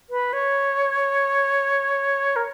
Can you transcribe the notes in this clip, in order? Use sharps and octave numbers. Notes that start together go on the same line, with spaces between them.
B4
C#5
A#4